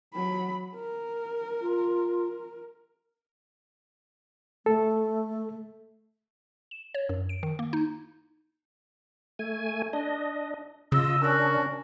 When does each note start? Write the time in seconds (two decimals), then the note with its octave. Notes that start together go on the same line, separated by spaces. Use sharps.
0.14 F#3 B5
0.75 A#4
1.62 F4
4.66 A3 A4
6.71 E7
6.94 C#5
7.09 F#2
7.29 D7
7.43 D#3
7.59 A#3
7.73 D#4
9.39 A3 G#5
9.93 D4 D#5
10.92 C#3 F4 D#5 E6
11.22 C#4 D4 F#4 A#4